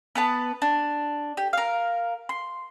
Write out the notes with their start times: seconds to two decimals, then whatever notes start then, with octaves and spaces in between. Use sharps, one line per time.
0.15 B3 B4 A5
0.62 D4
1.37 G4
1.53 A#4 F5
2.29 C6